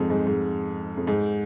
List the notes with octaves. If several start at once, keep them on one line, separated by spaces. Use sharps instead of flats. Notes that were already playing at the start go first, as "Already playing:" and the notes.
Already playing: F2 G#2
G#2
G#2
F2
G#2